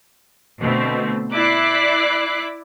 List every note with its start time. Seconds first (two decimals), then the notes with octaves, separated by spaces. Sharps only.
0.61 B2 D3 A3 C4
1.32 E4 D5 D6 F#6 B6 C7